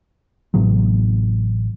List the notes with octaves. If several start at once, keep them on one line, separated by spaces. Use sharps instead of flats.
A1 C3 F#3